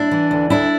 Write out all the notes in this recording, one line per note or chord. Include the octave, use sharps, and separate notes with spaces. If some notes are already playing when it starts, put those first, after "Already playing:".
Already playing: D4 E4
E3
D2
D2 D4 E4